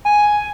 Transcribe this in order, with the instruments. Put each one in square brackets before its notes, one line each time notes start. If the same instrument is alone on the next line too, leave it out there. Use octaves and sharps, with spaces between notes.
[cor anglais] G#5